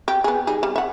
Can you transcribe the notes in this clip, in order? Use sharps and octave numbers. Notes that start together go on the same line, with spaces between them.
G4
B3 G#4
G3 D#4 G#4
G3
E5 F#5